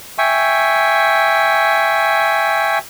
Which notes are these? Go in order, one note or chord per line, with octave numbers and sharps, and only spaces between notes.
E5 G5 G#5 C#6